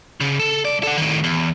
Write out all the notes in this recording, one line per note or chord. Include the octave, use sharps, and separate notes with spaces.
C#3
A4
C2 D5
A4 F#5
A2 D#3
E2